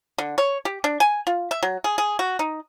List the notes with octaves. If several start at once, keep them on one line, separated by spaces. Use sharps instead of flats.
D3
C#5
G4
D4
G#5
F4
E5
F#3
G#4
G#4
F#4
D#4